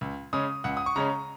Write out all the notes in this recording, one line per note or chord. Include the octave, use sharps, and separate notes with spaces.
C#2
C#3 G#3 C#4 D#6
C#2 F#5
D#6
C#6
C#3 G#3 C#4 A#5